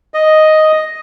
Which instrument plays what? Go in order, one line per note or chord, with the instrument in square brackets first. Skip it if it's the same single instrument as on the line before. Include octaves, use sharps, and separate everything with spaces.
[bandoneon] D#5